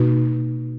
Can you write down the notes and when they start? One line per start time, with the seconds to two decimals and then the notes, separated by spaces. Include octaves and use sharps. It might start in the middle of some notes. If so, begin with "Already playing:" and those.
Already playing: B2 A#3 D#4 F#4